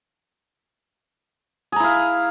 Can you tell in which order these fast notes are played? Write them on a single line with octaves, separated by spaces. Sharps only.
G#4 A#5 E4 F5